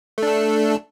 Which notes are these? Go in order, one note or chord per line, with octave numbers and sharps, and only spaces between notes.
A3 D4 A4